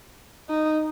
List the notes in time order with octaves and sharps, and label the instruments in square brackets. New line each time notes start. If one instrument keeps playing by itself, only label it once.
[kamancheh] D#4